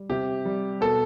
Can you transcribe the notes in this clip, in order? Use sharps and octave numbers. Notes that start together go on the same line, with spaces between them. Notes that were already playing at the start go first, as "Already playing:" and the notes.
Already playing: G3
C3 G4
G3
B2 A4